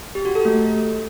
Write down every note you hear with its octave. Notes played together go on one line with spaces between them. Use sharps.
G4
F#4
A4
A3